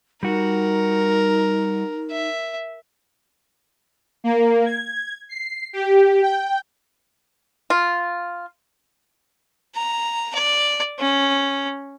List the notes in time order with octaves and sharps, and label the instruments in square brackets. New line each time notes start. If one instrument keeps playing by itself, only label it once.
[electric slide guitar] G3 F#4 [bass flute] D#4 [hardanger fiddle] A#4
[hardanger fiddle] E5
[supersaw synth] A#3
G#6
C7
G4
G5
[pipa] F4
[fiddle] A#5
D5
C#4